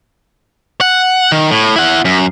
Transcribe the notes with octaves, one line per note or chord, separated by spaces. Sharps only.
F#5
D#3
A2
E4 F#5
F#2